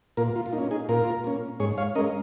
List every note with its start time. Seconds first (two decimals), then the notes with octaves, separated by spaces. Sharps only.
0.17 A#2 F4 A#4
0.36 F4
0.46 F4
0.53 A#3 D#4
0.58 C#4
0.71 D#4 G#4
0.89 A#2 F4 A#4
1.24 A#3 C#4
1.60 G#2 G#4 C#5
1.78 C#5 F5
1.95 G#3 C#4 A#4 D#5